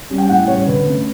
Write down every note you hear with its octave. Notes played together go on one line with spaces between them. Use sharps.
G3 C#4
G5
A2 F#5
G3 C#4 C#5
D3 B4
A3 C#4